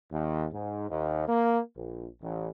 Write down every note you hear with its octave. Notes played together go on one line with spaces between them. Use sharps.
D#2
G#2
D#2
A#3
A#1
A1